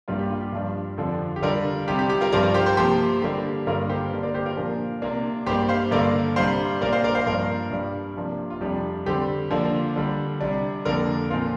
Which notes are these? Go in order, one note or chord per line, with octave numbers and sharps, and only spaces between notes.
G2 G3 A#3 D4 F4
G4
F4
G4
G2 F3 D4
F2 D3 F3 D4
G4
D3 G3 D4 F4 A#4
C3 G3 C4 G4
G4
G4
F4 A#4
G2 F3 C4 A#4 D5
A#4 D5
G4 C5
G4 C5
C3 F3 A#3 G4 C5
D3 G3 A#3 D4 G4
G2 D3 A#3 D4 F4 A#4
G4 C5
D3 A#3 D4
A#4 D5
G4 C5
F4 A#4
A#2 F3 A#3 D4
C3 A#3 D4
G2 G3 A#3 D4 G4 C5
C5 F5
G2 D3 A#3 D4 A#4 D5
C3 G3 D4 C5 F5
A#2 A#3 D4 A#4 D5
C5 F5
A#4 D5
C5 F5
G2 F3 A#3 D4 A#4 D5
G2 G3 D4
C3 F3 A#3 D4
F4
F2 C3 G3 D4 G4
D3 G3 C4 G4 C5
D3 F3 A#3 D4
D3 G3 D4
C3 G3 D4
F2 D3 A#3 D4 A#4 D5
A#2 F3 C4 F4 A#4